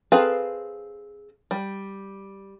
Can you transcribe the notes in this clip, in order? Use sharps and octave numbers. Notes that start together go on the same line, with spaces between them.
C4 G#4 A4 B4 F5
G3